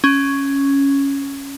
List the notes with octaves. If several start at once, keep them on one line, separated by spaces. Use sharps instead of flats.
C#4